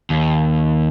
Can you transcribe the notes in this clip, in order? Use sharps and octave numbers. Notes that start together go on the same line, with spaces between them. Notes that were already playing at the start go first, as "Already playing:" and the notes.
D#2